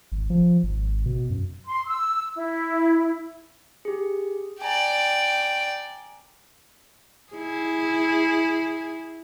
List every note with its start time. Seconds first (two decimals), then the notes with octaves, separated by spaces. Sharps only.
0.12 G#1
0.30 F3
0.63 G#1
1.06 B2
1.30 F#2
1.66 C6
1.86 E6
2.36 E4
3.85 G4 G#4
4.62 D5 G5 G#5 A#5
7.33 E4 G#4